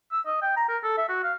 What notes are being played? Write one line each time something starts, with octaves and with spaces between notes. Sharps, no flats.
E6
D#5
G5
A#5
A#4
A4
E5
F#4
F5